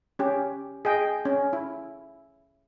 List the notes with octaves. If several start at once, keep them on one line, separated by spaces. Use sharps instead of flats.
C#4 G4
G#4 D#5 G5
C#4
E4